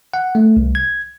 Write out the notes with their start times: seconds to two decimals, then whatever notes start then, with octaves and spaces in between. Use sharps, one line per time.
0.14 F#5
0.35 A3
0.57 C2
0.75 G#6